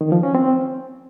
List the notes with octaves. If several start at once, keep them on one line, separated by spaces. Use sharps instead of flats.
D#3
F3
C#4
C4